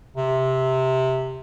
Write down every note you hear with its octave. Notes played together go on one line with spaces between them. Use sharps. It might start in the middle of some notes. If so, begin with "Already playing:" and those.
C3